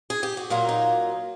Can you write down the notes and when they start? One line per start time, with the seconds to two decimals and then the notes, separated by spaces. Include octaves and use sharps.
0.10 G#4
0.23 G4
0.37 F#4
0.50 A#2 F#3 A#3 F4
0.69 D#4